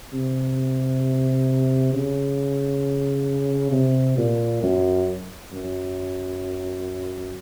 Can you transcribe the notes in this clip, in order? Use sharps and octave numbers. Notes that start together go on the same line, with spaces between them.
C3
C#3
C3
A#2
F#2
F#2